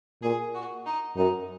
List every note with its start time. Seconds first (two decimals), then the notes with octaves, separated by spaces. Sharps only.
0.23 A#2 G#4
0.54 F#4
0.86 D#4
1.17 F#2 D#4